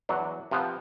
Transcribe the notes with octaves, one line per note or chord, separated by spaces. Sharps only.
E2 F#3 D4
C3 F3 B3